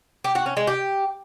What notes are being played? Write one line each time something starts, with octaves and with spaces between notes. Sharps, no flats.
G4
F#4
C#4
G#3
G4